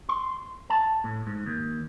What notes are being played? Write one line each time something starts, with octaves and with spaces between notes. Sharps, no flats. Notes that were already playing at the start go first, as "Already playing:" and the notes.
C6
A5
A2
G#2
D#2